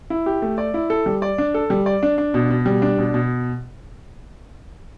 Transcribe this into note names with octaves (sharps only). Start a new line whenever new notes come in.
E4
G4
A3
D5
E4
A4
G3
D5
D4
A4
G3
D5
D4
D4
B2
B2
G3
D4
B2
B2